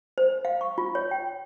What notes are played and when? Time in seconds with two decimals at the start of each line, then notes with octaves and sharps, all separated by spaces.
0.18 C5
0.45 F5
0.61 C#6
0.78 F4
0.95 C#5
1.11 G5